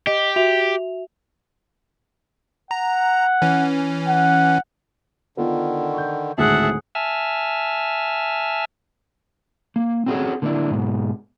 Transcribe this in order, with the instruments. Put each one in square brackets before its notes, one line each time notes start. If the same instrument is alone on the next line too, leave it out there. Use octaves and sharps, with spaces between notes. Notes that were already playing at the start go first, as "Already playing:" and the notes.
[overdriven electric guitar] G4 [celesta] D#5
[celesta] F#4 E5 F7
[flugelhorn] F#5 [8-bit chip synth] A#5
[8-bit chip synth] E3 C#4
[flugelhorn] F#5
[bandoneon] D3 D#3 [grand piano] B3 F4
[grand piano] C#6 G6
[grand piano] G#1 D2 A2 [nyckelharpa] G#4 F#5 [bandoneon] E5 A5
[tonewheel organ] E5 G#5 A5 E6 F6
[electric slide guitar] A#3
C4 C#4 F#4 G#4 A4 C#5
D3 A#3 C4 D4 E4
G#2 B2